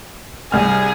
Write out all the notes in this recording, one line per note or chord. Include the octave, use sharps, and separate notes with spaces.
C2 G#4 F6